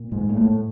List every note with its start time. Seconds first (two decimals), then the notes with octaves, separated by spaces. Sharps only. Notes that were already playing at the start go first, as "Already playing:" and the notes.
Already playing: A#2
0.12 G#2 G#3
0.29 A#3
0.37 A2 A3